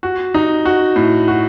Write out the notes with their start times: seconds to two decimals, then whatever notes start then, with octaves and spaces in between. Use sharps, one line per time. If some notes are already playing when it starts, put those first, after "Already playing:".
0.03 F#4
0.34 D#4
0.65 F#4
0.96 A2
1.28 F#4